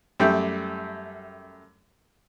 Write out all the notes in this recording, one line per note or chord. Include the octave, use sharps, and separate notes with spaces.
F#2 G3 A3 G5